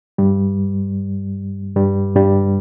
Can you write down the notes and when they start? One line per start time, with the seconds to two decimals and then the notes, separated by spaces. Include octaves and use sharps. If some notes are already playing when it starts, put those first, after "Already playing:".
0.18 G2 G3
1.76 G2 G3
2.16 G2 G3